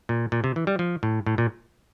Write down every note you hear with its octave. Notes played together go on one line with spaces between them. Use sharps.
A#2
A#2
C3
E3
G3
F3
A2
A2
A#2